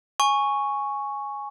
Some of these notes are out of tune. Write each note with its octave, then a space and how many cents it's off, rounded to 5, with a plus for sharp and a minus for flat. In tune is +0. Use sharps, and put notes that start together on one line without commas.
G#5 +0 C#6 +0